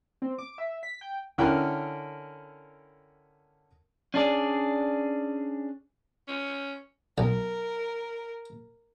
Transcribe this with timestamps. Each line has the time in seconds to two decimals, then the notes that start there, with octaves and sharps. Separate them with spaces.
0.22 C4
0.38 D6
0.58 E5
0.83 B6
1.01 G5
1.38 D3 C#4 E4 A#4 G5 F#6
4.14 C#4 D4 G#4 D5
6.28 C#4
7.18 B1 A#4